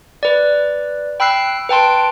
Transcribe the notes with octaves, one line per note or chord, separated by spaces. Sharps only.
B4 D5
G5 B5 E6 F#6 C7
B4 G5 A5 C6 D7